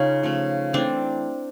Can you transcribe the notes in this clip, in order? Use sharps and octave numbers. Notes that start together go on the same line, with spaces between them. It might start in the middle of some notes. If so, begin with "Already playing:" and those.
Already playing: C#3 C#4 D#4 F4
C#3 F3 A3
E3 A3 C4 D4